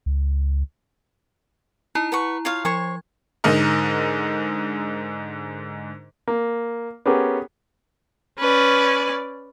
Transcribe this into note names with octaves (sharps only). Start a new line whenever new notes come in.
C#2
D#4 E4 A#5
B4 F#5 C#6
F4 C#5 F5
F3 C5 C#5 C#6 G#6
G#2 D3 D#4 A#4
A#3
B3 C#4 G4 G#4 A#4
C#4 B4 D5